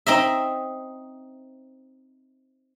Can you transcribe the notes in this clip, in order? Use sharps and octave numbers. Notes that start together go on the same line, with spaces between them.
C4 D#4 D#5 E5